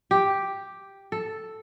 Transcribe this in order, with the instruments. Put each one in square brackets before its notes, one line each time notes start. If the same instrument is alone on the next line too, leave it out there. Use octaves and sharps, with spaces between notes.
[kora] G4
A4